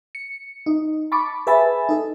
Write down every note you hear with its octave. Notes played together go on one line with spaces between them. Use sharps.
C#7
D#4
A5 B5 C#6 D6
G#4 B4 E5 G#5 A5 B5
D#4 A4